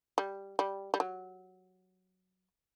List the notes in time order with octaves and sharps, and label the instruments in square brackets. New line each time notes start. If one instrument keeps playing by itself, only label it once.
[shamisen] G3
G3
G3
F#3